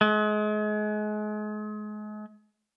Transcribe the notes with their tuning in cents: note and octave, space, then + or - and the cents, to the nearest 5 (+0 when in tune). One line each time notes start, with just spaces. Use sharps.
G#3 +35